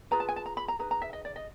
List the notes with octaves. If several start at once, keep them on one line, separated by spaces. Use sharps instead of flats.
F4 G#4 B4 A#5
A5
G#5
A5
A#5
B5
A#5
D#4 G#4 B4 A#5
A#5
E5
D#5
D5
D#5